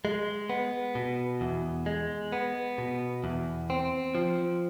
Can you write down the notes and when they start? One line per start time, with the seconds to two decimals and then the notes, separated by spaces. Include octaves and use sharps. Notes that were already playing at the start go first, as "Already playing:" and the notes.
0.05 G#3
0.50 B3
0.95 B2
1.41 E2
1.86 G#3
2.32 B3
2.78 B2
3.24 E2
3.70 C4
4.15 F3